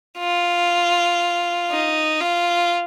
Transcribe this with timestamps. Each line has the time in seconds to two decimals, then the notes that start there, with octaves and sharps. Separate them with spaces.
0.19 F4
1.71 D#4
2.21 F4